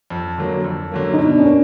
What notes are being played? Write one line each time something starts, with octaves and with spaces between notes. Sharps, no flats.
F2
D3 F#3 A#3
F2
D3 F#3 A#3
D#4
B2 D4
C#4
A#3 D4